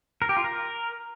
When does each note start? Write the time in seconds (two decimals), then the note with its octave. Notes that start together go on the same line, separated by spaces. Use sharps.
0.22 A#4
0.29 G4
0.37 F4
0.44 A#4